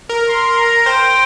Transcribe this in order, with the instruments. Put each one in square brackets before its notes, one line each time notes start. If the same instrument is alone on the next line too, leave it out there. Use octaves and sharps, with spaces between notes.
[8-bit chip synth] A#4
[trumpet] C6
A#5
[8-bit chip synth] C5 [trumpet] G5